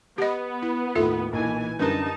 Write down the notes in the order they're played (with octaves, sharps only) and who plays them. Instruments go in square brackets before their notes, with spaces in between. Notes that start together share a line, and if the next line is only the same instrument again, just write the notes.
[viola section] B3 [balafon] G4 D#5
[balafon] E4
[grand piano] D#2 A2 [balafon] F4 A4 E5
[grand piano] B1 A#2 [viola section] E3 G#5
[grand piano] F#2 D3 [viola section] G3 D#4 A5 [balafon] A#4 B4